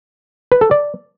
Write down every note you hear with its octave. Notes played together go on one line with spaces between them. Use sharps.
B4
A4
D5